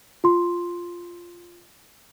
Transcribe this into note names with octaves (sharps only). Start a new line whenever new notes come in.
F4 C6